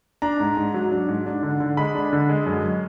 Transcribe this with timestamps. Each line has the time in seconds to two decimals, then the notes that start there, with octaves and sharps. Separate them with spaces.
0.22 D4 A#5
0.40 G#2
0.57 G#2
0.74 F#3
0.91 D4
1.09 G#2
1.26 D4
1.43 D3
1.60 D3
1.77 G#3 B5
1.95 D4
2.13 D3
2.29 G#3
2.46 F#2